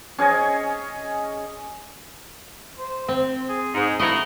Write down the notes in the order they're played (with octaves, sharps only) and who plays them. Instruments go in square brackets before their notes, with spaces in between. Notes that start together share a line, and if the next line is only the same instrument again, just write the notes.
[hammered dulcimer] C#4 G#4 C#5 D#5
[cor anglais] C5
[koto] C4
[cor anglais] G#4
[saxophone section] G#2
[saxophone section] A3 A#3 E4 [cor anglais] F#4 [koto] D#5 A#5